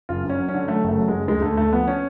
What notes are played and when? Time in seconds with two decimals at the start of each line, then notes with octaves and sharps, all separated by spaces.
0.09 F#1 F4
0.24 F#2
0.29 C#4
0.39 F#3
0.48 C#4
0.54 D3
0.68 F#3 A3
0.83 F#1
0.89 A3
0.98 F#3
1.08 F#1 G#3
1.27 D2 G#3
1.42 D2 A3
1.57 D2 A3
1.73 F3 B3
1.88 C#4